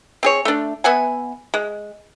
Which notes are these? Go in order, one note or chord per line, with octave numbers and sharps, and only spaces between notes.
C4 G#4 C#5
A3 D4
B3 E5 F#5 G#5
G#3